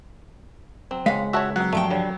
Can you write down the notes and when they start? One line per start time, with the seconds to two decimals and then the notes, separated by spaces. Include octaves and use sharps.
0.91 F#3 C4
1.06 C#2 G#3 F5 F#5 B6
1.33 F#4 G4 C#5 E5 A5 E6
1.56 F#3 B3 C4 F#5
1.73 G2 F3 A3 G5
1.91 D3 G3 C#5